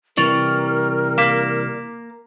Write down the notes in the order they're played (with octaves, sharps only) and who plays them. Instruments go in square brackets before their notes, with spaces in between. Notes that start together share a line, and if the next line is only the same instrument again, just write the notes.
[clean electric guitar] C3 E3 G3 [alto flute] A#4 [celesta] C#6 A6 F7
[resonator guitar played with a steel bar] A#3 [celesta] D6 B6 E7